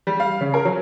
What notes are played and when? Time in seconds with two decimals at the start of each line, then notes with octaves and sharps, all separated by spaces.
0.07 G3
0.20 F5
0.41 C#3
0.54 A#4
0.65 F#3